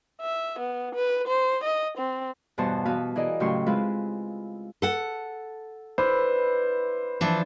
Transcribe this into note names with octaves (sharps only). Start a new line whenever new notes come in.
E5
B3
B4
C5
D#5
C4
E2 G2 B2 C5 A5 C#6
E3 B3 F#4 B4 F5
E3 G#4 A#4 D5 D#5
A2 C#3 F#3 G4 C6 C#6
G#3 C4 E4 F4 B4
A4 F#5
E4 B4 C5 D5
E3 F3 D4